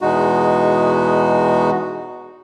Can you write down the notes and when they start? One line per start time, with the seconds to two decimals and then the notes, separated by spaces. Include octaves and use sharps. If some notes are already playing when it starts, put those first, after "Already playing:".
0.01 E2 B2 G#3 D#4 F#4